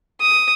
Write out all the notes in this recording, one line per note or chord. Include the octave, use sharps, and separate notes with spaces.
D#6